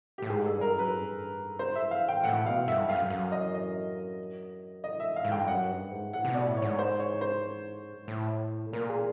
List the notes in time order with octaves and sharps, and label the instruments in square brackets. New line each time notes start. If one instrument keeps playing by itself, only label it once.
[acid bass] A2 [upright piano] G4
[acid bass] G#2 [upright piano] G#4
[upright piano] A4
[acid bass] G2
[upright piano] A#4
[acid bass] F#2
[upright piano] B4
[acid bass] G2
[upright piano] C5
E5
F5
G5
[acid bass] A2 [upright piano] F#5
[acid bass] B2 [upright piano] F5
[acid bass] G2 [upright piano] E5
[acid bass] G2 [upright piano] F5
[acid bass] F#2
F#2
[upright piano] D#5
D#5
D#5
E5
[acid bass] A2 [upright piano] F5
[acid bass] G#2
[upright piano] G5
[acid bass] G2
[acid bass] F#2 [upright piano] F#5
[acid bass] G2
G#2
[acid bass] A2 [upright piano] F#5
[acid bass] C3
[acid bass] B2 [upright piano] D5
[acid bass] A2
[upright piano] C#5
[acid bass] G#2
[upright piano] C5
C#5
C5
[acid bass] A2
[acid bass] A#2 [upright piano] A#4
[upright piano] G#4